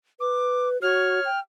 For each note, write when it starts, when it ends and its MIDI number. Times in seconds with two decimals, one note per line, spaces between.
0.20 0.81 71
0.20 0.68 86
0.82 1.20 66
0.82 1.29 73
0.82 1.39 89
1.25 1.40 79